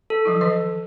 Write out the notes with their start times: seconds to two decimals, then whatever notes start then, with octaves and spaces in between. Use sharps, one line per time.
0.10 A4
0.25 F3 F#3 E4
0.41 D#3 E3 D#5